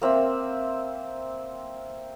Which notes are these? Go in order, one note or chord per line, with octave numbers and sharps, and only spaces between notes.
A#3 C4 E5 E6